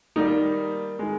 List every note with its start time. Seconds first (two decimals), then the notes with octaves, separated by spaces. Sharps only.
0.16 D#3 G3 A#3 D#4
0.99 D#3 G#3